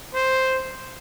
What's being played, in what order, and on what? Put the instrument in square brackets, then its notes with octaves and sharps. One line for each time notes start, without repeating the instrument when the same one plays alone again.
[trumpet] C5